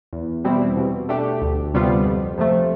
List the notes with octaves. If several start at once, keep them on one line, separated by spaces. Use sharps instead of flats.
E2
B2 G3 C4 E4
B2
A3 D4 G4
D2
C3 G3 B3 F4
F2
C3 F3 A3